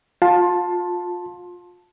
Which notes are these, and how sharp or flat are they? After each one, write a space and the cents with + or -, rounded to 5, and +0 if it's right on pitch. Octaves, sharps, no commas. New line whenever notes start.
F4 +25 A5 +0 C6 +20